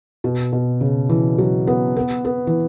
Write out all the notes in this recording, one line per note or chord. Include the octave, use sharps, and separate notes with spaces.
B2
B2
C#3
E3
F#3
B3
B3
B3
E3